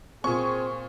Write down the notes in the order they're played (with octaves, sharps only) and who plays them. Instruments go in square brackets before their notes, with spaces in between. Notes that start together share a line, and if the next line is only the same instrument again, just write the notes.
[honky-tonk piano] A#2 C#6 [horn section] C4 G#4